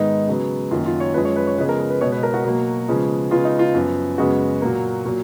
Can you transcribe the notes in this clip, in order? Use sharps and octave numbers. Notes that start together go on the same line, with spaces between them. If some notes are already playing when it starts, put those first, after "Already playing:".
Already playing: G#2 D#3 G#3 B3 D#4
C#3 F#3 B3
F#2 D#3 A#3 F4
F4
C#5
F#2 F3 G#3 B4
C#5
B4
C#5
C#3 F3 G#3 B3 B4
A#4
A#4
B4
B2 G#3 B3 C#5
B4
A#4
F#4
B2 F#3 A#3
C#3 F3 G#3 B3
C#3 G#3 B3 F4
D#4
F4
F#2 F3 B3
F#2 C#3 G#3 B3 F#4
A#2 F#3 A#3
A#2 F#3 A#3